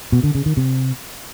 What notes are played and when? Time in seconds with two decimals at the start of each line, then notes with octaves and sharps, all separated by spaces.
0.12 B2
0.24 D3
0.35 C#3
0.46 D#3
0.57 C3